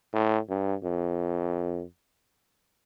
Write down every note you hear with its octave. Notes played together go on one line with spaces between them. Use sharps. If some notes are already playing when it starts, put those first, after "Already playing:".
A2
G2
F2